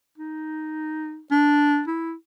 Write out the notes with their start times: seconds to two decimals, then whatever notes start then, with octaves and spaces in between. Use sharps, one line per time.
0.18 D#4
1.31 D4
1.88 E4